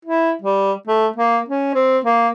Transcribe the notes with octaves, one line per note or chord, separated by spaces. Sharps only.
E4
G3
A3
A#3
C#4
C4
A#3